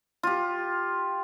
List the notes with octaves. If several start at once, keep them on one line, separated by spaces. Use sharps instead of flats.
F4 G4